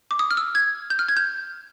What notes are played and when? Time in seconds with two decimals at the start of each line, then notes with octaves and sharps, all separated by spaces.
0.11 D6
0.19 D#6
0.31 F6
0.37 E6
0.55 G#6
0.90 G6
0.99 F6
1.08 G#6
1.17 G6